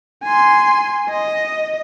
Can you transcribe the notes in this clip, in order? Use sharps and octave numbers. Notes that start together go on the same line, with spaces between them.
G#5 C6
D#5